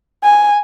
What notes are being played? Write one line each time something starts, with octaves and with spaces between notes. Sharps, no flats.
G#5